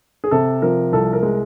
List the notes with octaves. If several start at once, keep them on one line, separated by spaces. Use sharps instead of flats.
G#4
C3 A4
F3 A#4
C2 A4
A#4
G#3